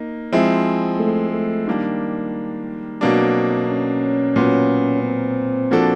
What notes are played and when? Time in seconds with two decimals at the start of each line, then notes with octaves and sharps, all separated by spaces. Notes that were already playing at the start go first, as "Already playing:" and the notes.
Already playing: A#3 D#4
0.33 F3 G#3 C4 E4
1.00 A3
1.33 A3
1.67 D#3 G3 A#3 D4
3.01 B2 F#3 A#3 C4 D4
3.69 C#4
4.36 A#2 F#3 B3
5.04 C4
5.71 F3 A#3 D4 F#4 A4